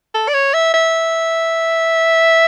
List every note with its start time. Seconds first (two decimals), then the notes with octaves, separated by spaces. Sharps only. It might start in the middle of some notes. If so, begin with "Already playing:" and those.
0.14 A4
0.28 D5
0.34 C#5
0.54 E5
0.73 E5